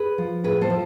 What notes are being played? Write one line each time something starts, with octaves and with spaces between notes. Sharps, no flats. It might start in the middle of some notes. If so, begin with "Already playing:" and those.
Already playing: G#4 B4
F3
A2 G#4 B4
A4 C5
F3